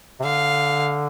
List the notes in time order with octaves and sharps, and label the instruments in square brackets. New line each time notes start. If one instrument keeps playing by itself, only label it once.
[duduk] C3
[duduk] D3 [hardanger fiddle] F5